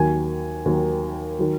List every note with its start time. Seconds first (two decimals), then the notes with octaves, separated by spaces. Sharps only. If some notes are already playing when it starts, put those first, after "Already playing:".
Already playing: D#2 D#3 F#3 G#5
0.66 D#2 D#3 F#3
1.39 D#3 F#3